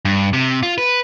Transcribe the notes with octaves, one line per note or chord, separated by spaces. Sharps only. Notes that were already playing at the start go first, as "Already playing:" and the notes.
G2
C3
F4
B4